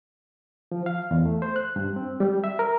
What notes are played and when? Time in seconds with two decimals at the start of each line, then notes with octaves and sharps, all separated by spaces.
0.72 F3
0.86 F5
1.11 E2
1.26 A3
1.42 C5
1.56 F#6
1.76 G2
1.96 C4
2.20 G3
2.44 E5
2.59 A#4